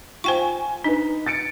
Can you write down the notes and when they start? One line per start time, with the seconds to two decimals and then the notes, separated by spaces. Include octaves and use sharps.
0.24 F4 C5 G5 G#5 C#6
0.84 D4 D#4 B4
1.26 A6 C#7 D7